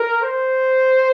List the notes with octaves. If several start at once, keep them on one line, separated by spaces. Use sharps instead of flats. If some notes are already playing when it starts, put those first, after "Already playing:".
Already playing: A#4
C5